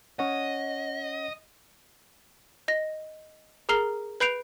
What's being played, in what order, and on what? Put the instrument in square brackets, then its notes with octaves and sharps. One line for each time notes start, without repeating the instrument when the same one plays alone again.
[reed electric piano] C#4 C#5 F#5 [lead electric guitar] D#5
[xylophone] D#5 A#6
G#4 A#4 A#5 F6 C7 G7
B4 B5 G6 C7 D7 F7